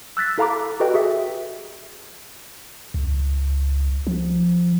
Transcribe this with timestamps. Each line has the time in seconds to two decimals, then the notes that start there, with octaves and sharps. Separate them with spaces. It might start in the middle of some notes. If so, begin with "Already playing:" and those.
0.17 E6 F#6 A6 B6
0.38 E4 A4 F5 A#5 B5 D6
0.80 F#4 G4 A4 B4 D#5 G5
0.94 F#4 G#4 E5
2.94 C#2
4.07 F3